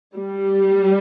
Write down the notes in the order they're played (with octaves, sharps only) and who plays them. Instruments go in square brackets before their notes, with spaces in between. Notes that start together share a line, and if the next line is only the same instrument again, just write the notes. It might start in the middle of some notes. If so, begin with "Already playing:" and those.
[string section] G3